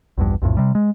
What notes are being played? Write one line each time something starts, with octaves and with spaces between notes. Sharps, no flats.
A#1 E2 G2
B1 F2 A2
C3 G3
G#3